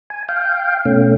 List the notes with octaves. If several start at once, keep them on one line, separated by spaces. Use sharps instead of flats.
G#5
F5 G5
B2 A3 C#4